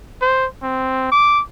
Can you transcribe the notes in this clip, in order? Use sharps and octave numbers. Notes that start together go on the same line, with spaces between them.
C5
C4
D6